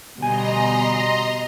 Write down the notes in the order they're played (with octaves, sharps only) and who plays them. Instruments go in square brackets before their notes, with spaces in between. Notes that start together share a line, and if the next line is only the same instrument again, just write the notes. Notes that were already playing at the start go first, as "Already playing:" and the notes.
[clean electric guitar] D2 G#5 [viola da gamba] B2 G3 B3 [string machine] D#5 A#5 C6